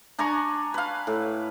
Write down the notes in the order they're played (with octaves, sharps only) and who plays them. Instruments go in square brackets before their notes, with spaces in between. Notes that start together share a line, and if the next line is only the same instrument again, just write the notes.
[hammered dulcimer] D4 G#5 A#5 C#6
B4 F5
A2